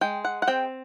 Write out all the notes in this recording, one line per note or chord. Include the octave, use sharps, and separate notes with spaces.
G#3 G5
F#5
F#5
C4 G5